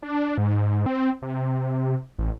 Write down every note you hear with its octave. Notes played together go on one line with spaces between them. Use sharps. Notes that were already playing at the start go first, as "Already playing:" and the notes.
D4
G#2
C4
C3
A1